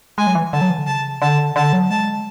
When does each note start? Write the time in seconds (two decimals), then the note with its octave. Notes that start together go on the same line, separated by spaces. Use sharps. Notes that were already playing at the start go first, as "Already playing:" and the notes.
0.18 G#3 G#5
0.27 F#3
0.35 E3
0.53 D3 A5
0.61 F#3
0.70 E3
0.78 D3
0.87 C#3 A5
1.22 D3 A5
1.56 D3 A5
1.73 F#3
1.90 G#3 A5